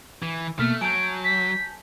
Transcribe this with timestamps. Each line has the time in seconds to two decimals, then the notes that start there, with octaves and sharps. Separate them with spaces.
0.23 E3
0.59 B2 A3 A#3 F6 B6
0.81 F#3 G#5 A5 G6 D7
1.25 B6